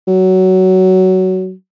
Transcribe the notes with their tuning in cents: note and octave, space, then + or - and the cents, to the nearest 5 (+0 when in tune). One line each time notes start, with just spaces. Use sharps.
F#3 +15